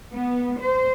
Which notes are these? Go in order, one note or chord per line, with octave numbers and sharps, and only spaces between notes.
B3
C5